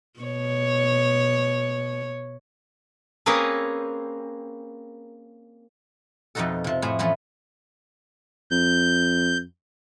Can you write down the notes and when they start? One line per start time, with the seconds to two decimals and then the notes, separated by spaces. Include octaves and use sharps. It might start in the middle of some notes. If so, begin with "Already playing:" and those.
0.20 B2 C#5
3.26 A#3 C4 C#4 G#4 A#4 B4
6.35 F2 B2 F3 D#4 F#4 A4
6.64 C3 F3
6.82 A2 B3 G#4 C5 C#5 G#5
6.99 E3 F3 A3 B3 C#4
8.51 F2 G6